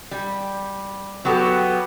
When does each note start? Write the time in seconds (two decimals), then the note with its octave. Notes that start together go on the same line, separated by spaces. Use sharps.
0.11 G3
1.25 F#3 B3 G4 A4